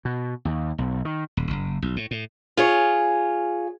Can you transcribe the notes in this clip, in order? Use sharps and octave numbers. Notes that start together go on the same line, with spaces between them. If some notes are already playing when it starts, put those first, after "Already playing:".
B2
D#2
B1
D#3
D#1
F#1
B1
A2
A2
F4 G#4 C#5